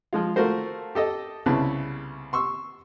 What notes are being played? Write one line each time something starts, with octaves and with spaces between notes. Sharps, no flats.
F3 G#3 F4
A3 F4 F#4 A#4 C5
G4 A4 D#5
C2 C#3 B3 E4 A5
C6 C#6 E6